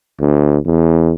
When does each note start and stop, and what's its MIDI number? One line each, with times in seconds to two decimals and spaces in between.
0.20 0.58 38
0.66 1.14 40